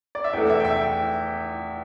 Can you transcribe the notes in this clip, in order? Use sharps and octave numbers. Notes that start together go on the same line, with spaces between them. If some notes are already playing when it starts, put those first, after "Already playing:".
D5
E5
E2 E3 A3 G5
E5
G5
E5
G5